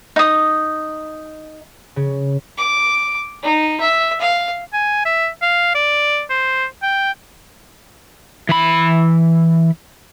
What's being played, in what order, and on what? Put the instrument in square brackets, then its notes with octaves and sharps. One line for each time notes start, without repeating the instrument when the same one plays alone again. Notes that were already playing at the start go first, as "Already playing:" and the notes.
[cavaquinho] D#4 D#6
[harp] C#3
[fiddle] D6
D#4
E5
F5
[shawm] G#5
E5
F5
D5
C5
G5
[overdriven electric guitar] E3 B5